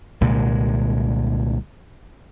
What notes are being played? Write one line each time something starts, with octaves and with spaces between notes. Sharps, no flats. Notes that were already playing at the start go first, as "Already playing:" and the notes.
C2 A#2 D3 G#3